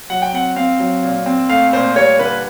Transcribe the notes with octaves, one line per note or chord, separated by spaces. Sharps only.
F#3 F#5
G5
C4 F#5
C4 F5
F#3
A#2
C4
A3 F5
A#2 C5
G3 C#5
D3 B4